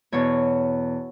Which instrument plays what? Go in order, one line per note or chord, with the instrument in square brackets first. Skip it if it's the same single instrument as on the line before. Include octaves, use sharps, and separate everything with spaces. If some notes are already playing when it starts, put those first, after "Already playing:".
[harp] E2 B2 C#5